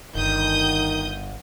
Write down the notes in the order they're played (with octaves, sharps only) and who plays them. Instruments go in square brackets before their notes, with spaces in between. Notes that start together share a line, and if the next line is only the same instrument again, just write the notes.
[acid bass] G1 [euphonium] D#3 [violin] D#6 G6